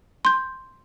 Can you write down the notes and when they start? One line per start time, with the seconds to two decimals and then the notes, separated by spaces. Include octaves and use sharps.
0.25 C6 G6